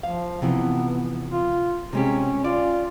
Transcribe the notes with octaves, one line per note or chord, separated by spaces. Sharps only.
F3 F5
C3 E3 F3 B3
F4
C3 G#3 C#4 G4
F4 D5